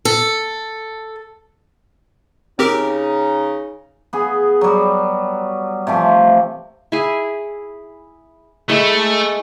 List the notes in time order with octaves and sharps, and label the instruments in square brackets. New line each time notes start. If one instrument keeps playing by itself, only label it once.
[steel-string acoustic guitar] A4
[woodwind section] C#3 D#4 [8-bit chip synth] C4 G4 A#4
[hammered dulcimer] B3 G#4
F#3 G3
C3 E3 F3 A3
[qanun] E4 G#4
[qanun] G#3 E4 [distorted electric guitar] A3